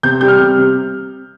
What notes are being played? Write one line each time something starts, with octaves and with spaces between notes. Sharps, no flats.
C3 G6
G3 G6
F6
C3
C3